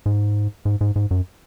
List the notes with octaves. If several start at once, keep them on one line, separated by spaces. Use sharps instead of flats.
G#2
G#2
G#2
G#2
F#2